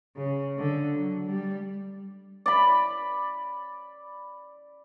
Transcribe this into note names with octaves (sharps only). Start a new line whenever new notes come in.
C#3
D3
F#3
G3
D5 B5